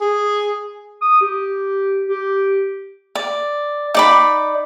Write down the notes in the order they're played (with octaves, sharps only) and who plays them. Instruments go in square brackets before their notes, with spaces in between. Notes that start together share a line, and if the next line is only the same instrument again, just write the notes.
[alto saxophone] G#4
[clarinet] D#6
G4
G4
[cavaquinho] D5
D#4 D5 B5